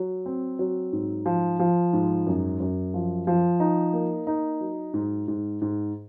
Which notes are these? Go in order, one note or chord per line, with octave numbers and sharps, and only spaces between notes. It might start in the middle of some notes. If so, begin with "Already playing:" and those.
Already playing: F#3
C4
F#3
G#2
F3
F3
G#2
F#2
F#2
F3
F3
D#4
A#3
D#4
F#3
G#2
G#2
G#2